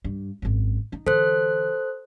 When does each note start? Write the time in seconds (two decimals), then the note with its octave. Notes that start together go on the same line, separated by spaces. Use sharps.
0.04 G2
0.42 G#1 F#2
0.92 D#4
1.07 D3 E3 A4 C5 F#6